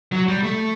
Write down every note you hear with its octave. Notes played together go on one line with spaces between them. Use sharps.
F#3
G3
A3